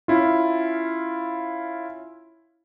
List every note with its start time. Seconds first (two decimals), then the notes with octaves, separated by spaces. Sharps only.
0.08 C#4 E4 F4